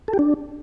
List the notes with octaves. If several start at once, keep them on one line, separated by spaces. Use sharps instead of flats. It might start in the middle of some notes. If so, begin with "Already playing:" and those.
A4
G4
D4